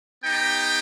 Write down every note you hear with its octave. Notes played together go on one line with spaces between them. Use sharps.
B3 D#4 G4 G5